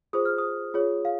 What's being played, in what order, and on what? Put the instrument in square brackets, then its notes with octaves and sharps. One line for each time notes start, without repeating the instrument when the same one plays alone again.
[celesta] F4 G#4 C5 D#6
F6
D#6
F4 G#4 C#5
F5